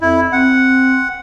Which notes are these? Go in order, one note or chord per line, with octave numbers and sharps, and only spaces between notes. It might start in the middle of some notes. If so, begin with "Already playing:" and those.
F2 E4
C4 F#5